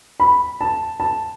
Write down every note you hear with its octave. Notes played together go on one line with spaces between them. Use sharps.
B5
A5
A5